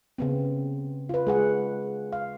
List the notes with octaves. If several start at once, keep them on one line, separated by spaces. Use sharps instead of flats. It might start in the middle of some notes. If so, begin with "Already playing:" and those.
C#3 B3 C4
F4 B4
G#3 G#4 F#5
F5